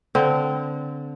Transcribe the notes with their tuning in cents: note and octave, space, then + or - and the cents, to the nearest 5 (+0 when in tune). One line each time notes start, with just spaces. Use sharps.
D3 -15 C4 -25